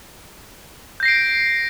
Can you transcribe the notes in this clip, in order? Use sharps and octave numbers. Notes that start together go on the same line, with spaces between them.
G6 A#6 C7 D7